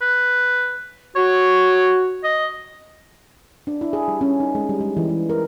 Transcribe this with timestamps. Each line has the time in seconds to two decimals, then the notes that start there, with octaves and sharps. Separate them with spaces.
0.01 B4
1.16 F#4 C#5
2.24 D#5
3.67 D4
3.81 E4
3.93 G#4
4.08 G3
4.21 C#4
4.40 D#4
4.55 G#3
4.69 G3
4.80 G#3
4.97 E3
5.09 G#3
5.30 A#4